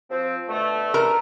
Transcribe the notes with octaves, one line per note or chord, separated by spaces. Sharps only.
F3 C4
B2 D3 A3
A#4